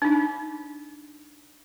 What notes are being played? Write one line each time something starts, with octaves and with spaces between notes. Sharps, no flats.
D4 D#4